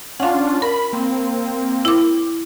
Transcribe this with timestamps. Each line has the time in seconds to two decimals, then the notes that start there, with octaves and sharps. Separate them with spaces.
0.20 C#4 D4 F4 F5 F#5
0.62 A#4 B5
0.93 A#3 C4
1.85 E4 D6